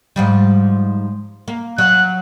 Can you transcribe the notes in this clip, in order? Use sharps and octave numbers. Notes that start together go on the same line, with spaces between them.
G#2 F3 G3
A#3
F#3 F#6